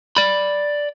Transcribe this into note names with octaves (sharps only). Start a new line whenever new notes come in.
D5 B5